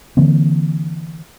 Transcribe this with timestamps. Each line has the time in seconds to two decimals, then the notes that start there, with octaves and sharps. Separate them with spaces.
0.17 D3 E3 A#3 C4